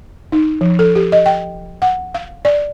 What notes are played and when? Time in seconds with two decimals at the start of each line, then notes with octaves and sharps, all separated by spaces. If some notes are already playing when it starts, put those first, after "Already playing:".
0.32 D#4
0.61 F3
0.79 A4
0.95 G4
1.12 D#5
1.26 G5
1.82 F#5
2.14 F5
2.45 D5